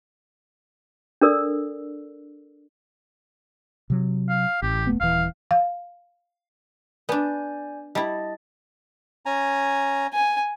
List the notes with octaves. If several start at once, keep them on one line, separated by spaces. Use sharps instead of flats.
D4 A4 A#4 D5 E6
C3 F#3
F5
A1 G4
E1 A3 B3
D#1 E3 F5
F5
B3 D4 D5 G#5 G6
G3 E4 D#5 A5 A6
C#4 G#5 A#5
G#5